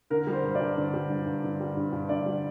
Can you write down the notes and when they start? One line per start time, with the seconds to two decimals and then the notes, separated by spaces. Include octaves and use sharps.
0.10 D3 A#4
0.27 G3
0.32 C5
0.43 G2
0.55 D5
0.61 G2
0.77 D3
0.94 G3
1.10 G2
1.26 G2
1.43 D3
1.60 G3
1.77 G2
1.93 G2
2.09 D3 D5
2.26 G3